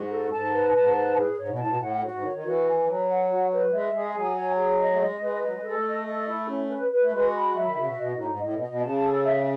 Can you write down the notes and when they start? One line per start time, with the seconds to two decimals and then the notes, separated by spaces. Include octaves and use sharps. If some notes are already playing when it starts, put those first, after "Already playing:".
Already playing: G#2 F#4
0.09 A4
0.26 F#2
0.30 G#2 A5
0.52 B4
0.73 G#2 A5
0.94 B4
1.16 A2 G#4
1.37 G#2 C#5
1.48 B2
1.58 A2 A5
1.67 B2
1.76 A2 F#5
2.01 G#2 F#4
2.11 G#2
2.22 D#3 C#5
2.33 D#3
2.44 E3 F#4
2.65 G#5
2.86 F#3 B4
3.08 F#5
3.28 F#4
3.50 B4
3.66 F#3
3.71 G#3 E5
3.92 G#3 G#4
4.13 F#3 G#5
4.35 C#5
4.56 G#4
4.77 D#5
4.90 A3
4.98 G#3 D#5
5.20 G#3 B4
5.41 F#3 D#5
5.52 G#3
5.62 G#3 A4
5.73 A3
5.84 D#5
6.05 A4
6.27 E4
6.48 C#4
6.69 B4
6.90 B4
7.02 A3
7.11 G#3 F#4
7.33 B5
7.54 F#3 E5
7.65 D#3
7.75 C#3 F#4
7.86 B2
7.96 B2 D#5
8.11 A2
8.18 D#4
8.25 G#2
8.39 A2 D#5
8.53 B2
8.61 D#5
8.67 B2
8.81 C#3 A5
9.02 A4
9.25 E5